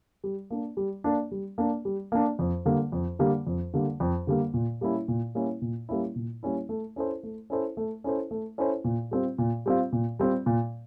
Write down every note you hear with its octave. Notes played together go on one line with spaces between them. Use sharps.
G3
A#3 D4
G3
A#3 D4
G3
A#3 D4
G3
A#3 D4
F2
D3 G3 A#3
F2
D3 G3 A#3
F2
D3 G3 A#3
F2
D3 G3 A#3
A#2
G3 A#3 C#4 E4
A#2
G3 A#3 C#4 E4
A#2
G3 A#3 C#4 E4
A#2
G3 A#3 C#4 E4
A3
C#4 E4 A4 C5
A3
C#4 E4 A4 C5
A3
C#4 E4 A4 C5
A3
C#4 E4 A4 C5
A#2
G3 C4 F4
A#2
G3 C4 F4
A#2
G3 C4 F4
A#2